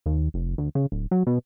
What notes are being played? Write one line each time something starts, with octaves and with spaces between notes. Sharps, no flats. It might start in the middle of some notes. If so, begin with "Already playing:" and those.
D#2
F1
D2
C#3
D1
F#3
B2